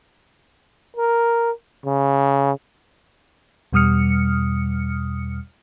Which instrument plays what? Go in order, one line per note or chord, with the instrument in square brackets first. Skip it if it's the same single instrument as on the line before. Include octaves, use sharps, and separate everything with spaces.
[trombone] A#4
C#3
[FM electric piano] E2 B2 G3 D#6 F6 C#7